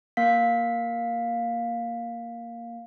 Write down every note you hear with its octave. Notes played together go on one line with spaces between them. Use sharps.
A#3 F5 B6